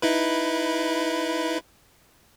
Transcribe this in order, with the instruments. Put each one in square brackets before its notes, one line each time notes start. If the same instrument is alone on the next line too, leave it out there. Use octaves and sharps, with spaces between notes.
[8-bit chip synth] D#4 E4 B4